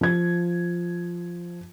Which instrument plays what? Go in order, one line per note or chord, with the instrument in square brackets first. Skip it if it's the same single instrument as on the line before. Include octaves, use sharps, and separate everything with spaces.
[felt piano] F3 G#6